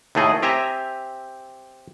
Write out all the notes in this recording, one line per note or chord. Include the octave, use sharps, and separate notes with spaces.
D#2 A2 A3 G#4 D#5
C4 G4 E5 G#5 A#5